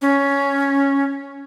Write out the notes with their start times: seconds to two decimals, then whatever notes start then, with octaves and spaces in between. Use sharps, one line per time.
0.02 C#4